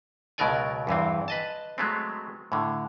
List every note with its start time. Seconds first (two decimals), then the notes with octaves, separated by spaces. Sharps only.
0.38 C#2 B2 F#3 A#4 D5 G#5
0.87 E2 G2 E3 C4
1.28 B4 D#5 A5
1.78 F#3 G#3 A3 B3 C4
2.52 A2 D3